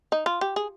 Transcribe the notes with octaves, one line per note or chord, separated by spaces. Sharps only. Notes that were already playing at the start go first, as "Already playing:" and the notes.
D#4
F4
G4
G#4